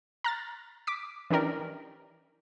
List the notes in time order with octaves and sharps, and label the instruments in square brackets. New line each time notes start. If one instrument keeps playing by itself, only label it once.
[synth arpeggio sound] A#5 F6 A6
D6 B6
E3 C#4 D4 G4 A#4 D5